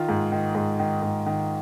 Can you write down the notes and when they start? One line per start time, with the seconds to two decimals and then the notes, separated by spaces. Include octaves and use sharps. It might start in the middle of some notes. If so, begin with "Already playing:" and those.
Already playing: D#3 F4
0.09 G#2
0.32 D#3
0.55 G#2
0.79 D#3
1.02 G#2
1.26 D#3